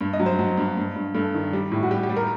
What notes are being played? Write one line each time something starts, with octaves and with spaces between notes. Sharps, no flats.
G2
D#5
F#3
C5
F#3
G2
G2
G2
G2 A4
D#3
G3
A2
F#4
G3 G4
G4
G3
A#4